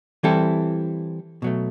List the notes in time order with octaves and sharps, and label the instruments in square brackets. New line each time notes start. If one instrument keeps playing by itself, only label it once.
[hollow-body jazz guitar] E3 G3 C4 E4 A4
B2 F#3 A3